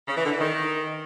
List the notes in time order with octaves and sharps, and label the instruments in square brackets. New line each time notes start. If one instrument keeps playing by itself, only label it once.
[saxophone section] C#3
E3
D3
E3
D#3